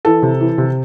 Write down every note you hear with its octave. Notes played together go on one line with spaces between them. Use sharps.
E3 A4
C3
E3
C3